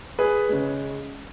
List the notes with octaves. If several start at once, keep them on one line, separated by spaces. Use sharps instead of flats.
G#4 B4
C#3 G#3